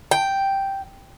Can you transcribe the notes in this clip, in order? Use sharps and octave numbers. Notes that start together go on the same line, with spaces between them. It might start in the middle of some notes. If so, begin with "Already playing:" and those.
G5